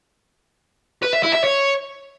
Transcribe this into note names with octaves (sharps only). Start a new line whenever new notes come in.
B4
E5
E4
E5
C#5